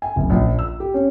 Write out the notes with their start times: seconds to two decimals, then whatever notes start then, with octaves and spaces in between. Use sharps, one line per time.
0.02 G#5
0.16 F#1
0.30 A#1
0.59 E6
0.80 G4
0.94 C#4